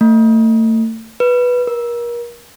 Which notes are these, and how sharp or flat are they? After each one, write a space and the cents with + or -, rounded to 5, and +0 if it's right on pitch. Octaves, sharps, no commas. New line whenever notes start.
A3 +35
B4 -5
A#4 +35